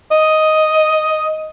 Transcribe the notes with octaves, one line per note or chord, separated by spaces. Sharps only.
D#5